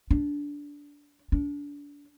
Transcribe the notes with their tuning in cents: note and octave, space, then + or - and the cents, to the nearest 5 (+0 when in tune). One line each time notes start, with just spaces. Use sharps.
D4 -15
D4 -30